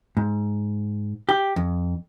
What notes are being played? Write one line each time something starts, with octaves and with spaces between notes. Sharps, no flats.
G#2
G4
F2